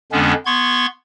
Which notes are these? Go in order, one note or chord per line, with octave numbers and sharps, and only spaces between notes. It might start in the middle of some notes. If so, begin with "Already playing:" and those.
F2 D3 G#3 B3 C#4 D4
B3 C6 C#6 G#6